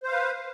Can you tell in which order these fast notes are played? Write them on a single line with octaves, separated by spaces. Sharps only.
C5 F5 B4